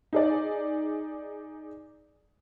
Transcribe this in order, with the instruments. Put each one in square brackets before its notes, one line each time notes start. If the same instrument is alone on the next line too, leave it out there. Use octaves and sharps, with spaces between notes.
[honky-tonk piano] D#4 G#4 D5